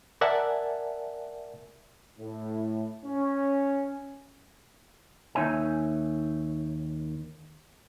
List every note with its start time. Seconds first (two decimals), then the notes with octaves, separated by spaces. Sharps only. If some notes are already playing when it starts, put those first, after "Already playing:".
0.21 A#4 D5 E5 F#5 G#5 A5
2.19 A2
3.05 C#4
5.35 D#2 D#4 C#5 E5 G#5